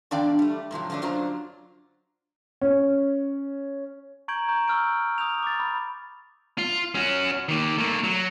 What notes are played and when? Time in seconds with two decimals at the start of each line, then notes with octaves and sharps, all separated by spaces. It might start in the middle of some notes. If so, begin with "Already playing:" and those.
0.11 E2 D3 D4 D5 F5 G5
0.39 G3 A3
0.71 G#2 C3 F3 F#3
0.90 D3 F3 F#3 A3 D4
1.02 F#2 F#3 D4 F4 C5 A#5
2.61 C#4
4.28 A#5 C#6 G6 G#6 D7 F#7
4.48 A#5 C#6 G6
4.67 C#6 E6 F6 G6 D7
5.18 D#6 F6 G6 F7
5.43 D6 A6
5.60 B5
6.58 F4
6.95 C#4 F#4
7.49 D#3 A#3
7.78 A3 A#3
8.04 F#3